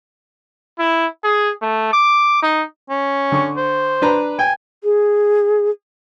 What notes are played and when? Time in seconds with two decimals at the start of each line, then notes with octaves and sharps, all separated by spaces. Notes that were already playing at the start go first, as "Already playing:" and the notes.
0.79 E4
1.24 G#4
1.62 A3
1.93 D6
2.42 D#4
2.90 C#4
3.32 D3 C#6
3.57 C5
4.02 D4 B4 A#5
4.39 G5 G#5
4.84 G#4